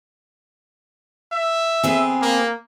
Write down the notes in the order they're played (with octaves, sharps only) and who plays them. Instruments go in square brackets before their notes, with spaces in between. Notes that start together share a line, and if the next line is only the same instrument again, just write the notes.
[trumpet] E5
[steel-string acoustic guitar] B3 C4 G#4
[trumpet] A#3